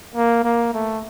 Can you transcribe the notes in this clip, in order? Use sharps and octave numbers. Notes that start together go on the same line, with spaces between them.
A#3
A#3
A3